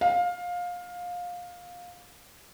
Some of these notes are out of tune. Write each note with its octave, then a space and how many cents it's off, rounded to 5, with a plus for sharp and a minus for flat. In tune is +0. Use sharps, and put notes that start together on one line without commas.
F5 +20